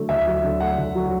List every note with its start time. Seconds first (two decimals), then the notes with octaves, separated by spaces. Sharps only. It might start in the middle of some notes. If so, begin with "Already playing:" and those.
Already playing: D3 F#3 A3
0.09 D2 E5
0.26 F#3
0.44 D3
0.60 A3 F#5
0.78 D2
0.95 F#3